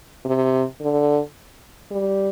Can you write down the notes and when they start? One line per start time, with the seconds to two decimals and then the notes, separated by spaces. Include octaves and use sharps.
0.25 C3
0.81 D3
1.91 G3